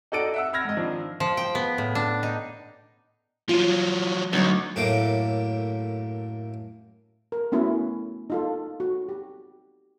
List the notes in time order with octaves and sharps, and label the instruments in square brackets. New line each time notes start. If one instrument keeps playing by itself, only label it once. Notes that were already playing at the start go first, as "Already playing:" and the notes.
[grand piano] D#4 F#4 A4 D5 D7
E5 F#5 E6
B5 E6 F6 G#6 A#6
G#2 D#5
D#3 F3 D4
[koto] F3
G5
B3
A2
D4
D#4
[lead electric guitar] F3 F#3 [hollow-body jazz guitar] F4
[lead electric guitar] D2 [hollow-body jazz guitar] F#3 D#4 C#5
[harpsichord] F#2 A2 A3 A#3 D6
[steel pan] A#4
A3 B3 C#4 E4 F#4
D#4 F4 A4
F#4
G4